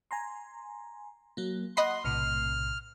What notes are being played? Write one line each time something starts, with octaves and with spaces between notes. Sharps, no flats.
G#5 A#5 C6
F#3 A#3
D#5 F#5 B5 C6 F#6 C7
B1 A2 C3 F6